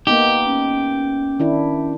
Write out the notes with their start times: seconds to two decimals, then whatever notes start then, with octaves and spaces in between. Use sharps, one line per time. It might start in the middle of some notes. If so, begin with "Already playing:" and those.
0.07 A#3 B3 D#4 G4
0.46 C#4
1.40 D#3 D4 E4